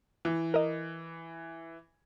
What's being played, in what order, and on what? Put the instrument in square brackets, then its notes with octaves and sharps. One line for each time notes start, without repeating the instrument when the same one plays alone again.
[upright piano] E3
[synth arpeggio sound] A#4 D#5